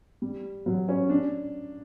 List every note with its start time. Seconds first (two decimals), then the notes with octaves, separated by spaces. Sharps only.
0.22 G3
0.66 F#3
0.89 C#4
1.09 D4